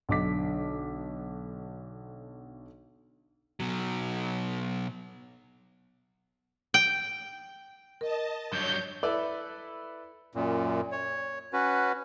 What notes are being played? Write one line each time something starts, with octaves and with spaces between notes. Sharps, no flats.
B1 D3 D6 B6
B2 F#3
G5
A#4 D#5 A5
G2 F#3 C#5 G6
E4 A4 B4 D5
F#2 A#2
C#5
C#4 F#4 B4